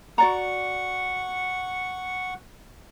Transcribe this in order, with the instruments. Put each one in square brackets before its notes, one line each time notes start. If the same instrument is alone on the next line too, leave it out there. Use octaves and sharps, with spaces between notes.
[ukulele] F#4 D5 A#5 [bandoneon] F#5 C#6